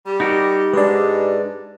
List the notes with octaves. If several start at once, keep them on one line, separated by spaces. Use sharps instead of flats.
G3 G4
D#4 F#4 G4 A#4
G#2 G#3 D4 B4 D5